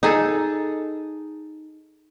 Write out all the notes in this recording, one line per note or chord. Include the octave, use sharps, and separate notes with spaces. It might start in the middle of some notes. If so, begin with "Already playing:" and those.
D#4 G#4 A4